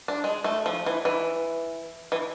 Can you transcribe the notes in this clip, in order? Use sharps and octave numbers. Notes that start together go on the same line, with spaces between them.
D4
G#3
A3
F3
E3
E3
E3